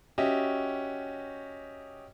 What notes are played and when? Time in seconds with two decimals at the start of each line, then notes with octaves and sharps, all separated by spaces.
0.18 C#4 F#4 G4 D#5 E5